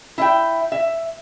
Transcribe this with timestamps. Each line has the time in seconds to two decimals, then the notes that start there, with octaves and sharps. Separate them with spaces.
0.18 E4 E5 G5
0.72 E5